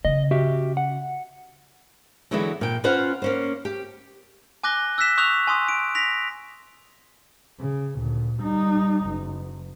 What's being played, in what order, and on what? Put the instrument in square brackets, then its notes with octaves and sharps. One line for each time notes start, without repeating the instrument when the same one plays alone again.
[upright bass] C#3 [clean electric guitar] D#5
[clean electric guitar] F#4 G4 E5
F#5
[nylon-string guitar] D3 E3 F#3 G#3 B3 E4
A#2 G5
C#4 F4 B4 C5 F#5
A#3 C#4 C5
G4
[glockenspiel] G#5 D6 F#6 A#6 G7
E6 F#6 A#6 B6 E7
C#6 D#6 E6 F#6 G6 F7
G#5 C6 D#6
D7
A#6 B6 F7
[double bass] C#3
D2 A#2
G3 D#4
F#1